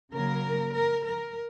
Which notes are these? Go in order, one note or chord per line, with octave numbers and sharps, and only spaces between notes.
C#3 F#3 A#3 A#4
A#4
A#4